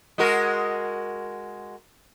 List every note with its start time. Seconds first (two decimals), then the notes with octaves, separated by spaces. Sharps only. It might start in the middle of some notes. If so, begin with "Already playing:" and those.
0.18 G#3 F#4 A#4